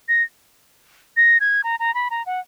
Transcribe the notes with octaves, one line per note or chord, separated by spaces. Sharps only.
A#6
A#6
G#6
A#5
A#5
B5
A#5
F#5